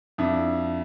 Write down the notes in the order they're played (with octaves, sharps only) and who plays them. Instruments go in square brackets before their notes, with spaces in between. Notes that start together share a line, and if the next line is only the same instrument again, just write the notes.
[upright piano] F2 D4 E4